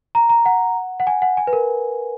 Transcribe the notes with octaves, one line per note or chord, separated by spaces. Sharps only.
A#5
A#5
F#5
F#5
G#5
F#5
G#5
B4
A#4